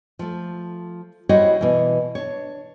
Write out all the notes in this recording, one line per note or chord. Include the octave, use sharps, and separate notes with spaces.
F3 A3
G3 E4 F#4 C5 C#5 D#5
B2 E3
D4 C#5